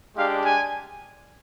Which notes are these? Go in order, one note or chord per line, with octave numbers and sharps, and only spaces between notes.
G#3 D4 G4 F5
G#5